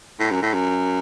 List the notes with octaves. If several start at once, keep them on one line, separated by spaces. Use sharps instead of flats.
A2
F#2
A2
F#2